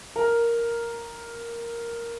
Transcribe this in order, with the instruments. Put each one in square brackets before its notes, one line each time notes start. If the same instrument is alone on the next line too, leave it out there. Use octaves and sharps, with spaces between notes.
[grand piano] A#4